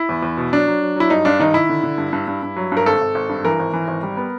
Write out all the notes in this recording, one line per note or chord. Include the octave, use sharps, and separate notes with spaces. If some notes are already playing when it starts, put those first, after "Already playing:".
Already playing: E4
E2
E2
B2
F#3 D4
F#3
F#3
F#3 E4
G2 D#4
G2 D4
D#3 D#4
D#3 E4
D3
D3
G2
G2
G2
G2
F#3
G2
A#4
G#1 A4
G#1
G#1
G2
E3 A#4
G#1
E3
G#1
G3
B3